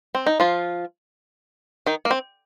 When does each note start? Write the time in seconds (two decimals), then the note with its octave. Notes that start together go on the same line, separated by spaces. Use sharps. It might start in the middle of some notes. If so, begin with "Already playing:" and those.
0.15 C4
0.26 D#4
0.40 F3 F4
1.86 D#3 D#4
2.05 A#3
2.11 C4